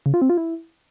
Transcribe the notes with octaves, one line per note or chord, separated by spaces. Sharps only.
C#3
F4
C4
F4
E4